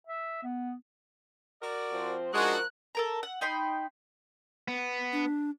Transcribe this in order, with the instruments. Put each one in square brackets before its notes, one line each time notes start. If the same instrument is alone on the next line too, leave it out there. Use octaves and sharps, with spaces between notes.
[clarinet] E5
B3
[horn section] F#4 A#4 D5
[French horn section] F3 C4 C5
[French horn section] F3 A#4 [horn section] G#3 [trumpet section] D4 D#4 F#4 [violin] F#6
[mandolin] A4 A#4 A#5
F#5
D#4 G5 B5 C6
[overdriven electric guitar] B3
[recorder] D4